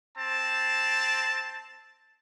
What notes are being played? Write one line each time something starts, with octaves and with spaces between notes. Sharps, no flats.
C4 A5